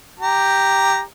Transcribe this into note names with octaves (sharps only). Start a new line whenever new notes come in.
G4 A#5